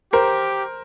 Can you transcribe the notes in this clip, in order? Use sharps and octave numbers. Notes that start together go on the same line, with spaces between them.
G4 A#4 C5